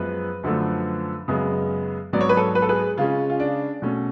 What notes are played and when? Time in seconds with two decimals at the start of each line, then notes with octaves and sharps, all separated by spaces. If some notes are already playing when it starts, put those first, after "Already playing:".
Already playing: F#2 F3 G#3 B3 B4
0.43 F#2 D3 F3 A3
1.28 F#2 C#3 G#3 B3
2.13 G#2 F#3 B3 D5
2.21 C#5
2.29 B4
2.37 A4 C#5
2.55 B4
2.62 A4
2.69 G#4 B4
2.97 C#3 G#3 C#4 F4 G#4
3.30 F4
3.40 D4
3.82 B2 A3 C#4